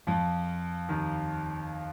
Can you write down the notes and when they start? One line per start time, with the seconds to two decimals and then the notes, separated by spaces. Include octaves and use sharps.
0.07 F2 F3
0.89 D#2 D#3